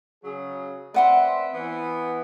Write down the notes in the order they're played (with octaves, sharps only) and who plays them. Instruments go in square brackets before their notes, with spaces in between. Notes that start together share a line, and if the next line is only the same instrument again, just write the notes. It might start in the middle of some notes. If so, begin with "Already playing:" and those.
[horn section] C#3 F#3 G#4
[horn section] C4 D5 E5 [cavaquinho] B4 F#5 C6
[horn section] E3 B3